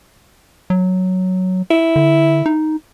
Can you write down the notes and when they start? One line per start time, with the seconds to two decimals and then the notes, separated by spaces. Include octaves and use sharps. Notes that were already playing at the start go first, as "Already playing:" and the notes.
0.70 F#3
1.71 E4
1.96 D3
2.46 D#4